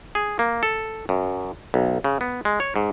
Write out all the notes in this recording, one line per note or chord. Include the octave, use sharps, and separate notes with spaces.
G#4
A#3
A4
F#2
B1
C#3
B3
G#3
C#5
G#2